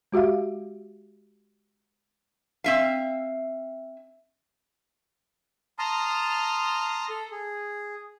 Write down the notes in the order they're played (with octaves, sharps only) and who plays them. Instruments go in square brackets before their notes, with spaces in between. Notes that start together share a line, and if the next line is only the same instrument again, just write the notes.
[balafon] G#3 F#4 G4 E5 F5
[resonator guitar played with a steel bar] C4 E5 F5
[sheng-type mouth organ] A5 A#5 C6 D#6 F6
A4
G#4